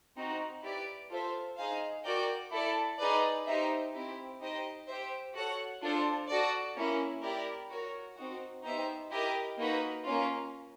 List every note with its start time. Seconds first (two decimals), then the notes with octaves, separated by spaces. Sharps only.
0.16 C4 D#4 F#4
0.62 E4 G4 B4 D5
1.10 F4 A4 C5 E5
1.57 D#4 G#4 C5 F5
2.04 F#4 A#4 D5 G5
2.51 E4 A4 D5
2.98 D#4 G#4 B4 D5
3.46 D#4 G4 C5 E5
3.93 C4 E4 G4
4.40 D#4 G4 C5 D#5
4.87 G4 C5 E5
5.34 F#4 A4 C#5 F#5
5.81 D4 F4 A4 C5
6.28 F#4 A4 D5
6.75 A#3 C#4 E4
7.22 E4 G4 A#4 D5
7.70 F#4 A#4 C#5
8.17 C4 D#4 F#4
8.64 B3 D#4 G4 C5 E5
9.11 E4 G4 A#4 D#5 G5
9.58 A#3 D#4 F#4 B4
10.05 A#3 C#4 F4